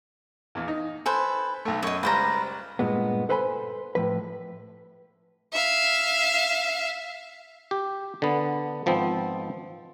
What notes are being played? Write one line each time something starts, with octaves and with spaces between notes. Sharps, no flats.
A#1 E2
D#4
A4 B4 C5 G#5
B1 A3
F#2 C#5 D#5
C#2 G3 B4 C5 A#5
G2 A#2 G#3 B3
A4 B4 C5 G#5 A5 B5
A2 F3 B4
E5 F5
G4
D3 B3
G#1 F3 B3 C4